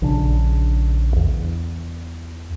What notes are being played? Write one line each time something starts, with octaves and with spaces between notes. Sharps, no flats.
A#1 C#3 D4
E2